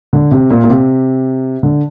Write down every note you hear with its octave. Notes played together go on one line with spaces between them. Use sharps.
D3
C3
A#2
A#2
C3
D3